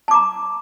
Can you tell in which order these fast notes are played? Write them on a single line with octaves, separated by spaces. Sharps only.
A5 D6 A#5